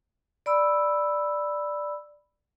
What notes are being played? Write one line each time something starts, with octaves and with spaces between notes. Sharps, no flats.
D5 B5 E6